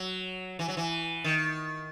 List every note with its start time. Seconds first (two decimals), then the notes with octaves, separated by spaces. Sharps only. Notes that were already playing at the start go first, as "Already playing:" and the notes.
Already playing: F#3
0.59 E3
0.68 F#3
0.77 E3
1.24 D#3